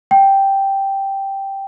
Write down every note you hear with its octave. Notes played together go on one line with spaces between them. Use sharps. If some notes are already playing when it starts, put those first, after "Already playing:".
G5